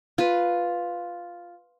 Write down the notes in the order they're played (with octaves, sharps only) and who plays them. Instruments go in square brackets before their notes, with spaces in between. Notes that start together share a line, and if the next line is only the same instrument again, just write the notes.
[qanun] F4 B4